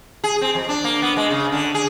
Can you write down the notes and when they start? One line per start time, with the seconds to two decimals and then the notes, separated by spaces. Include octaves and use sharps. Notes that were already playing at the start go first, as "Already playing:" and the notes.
0.24 G#4
0.41 C4
0.55 F2
0.69 D4
0.84 A#3
1.02 B3
1.17 G#3
1.31 C#3
1.52 D3
1.74 G#4